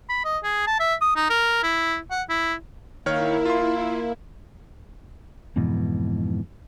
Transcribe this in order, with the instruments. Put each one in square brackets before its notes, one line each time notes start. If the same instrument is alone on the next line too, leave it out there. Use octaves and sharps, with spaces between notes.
[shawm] B5
D#5
G#4
A5
E5
D#6
D#4
A#4
E4
F#5
E4
[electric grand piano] D#3 C#5 F6 [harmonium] A#3 [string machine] E4
[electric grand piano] F4 C6
[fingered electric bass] F2 G#2 B2 E3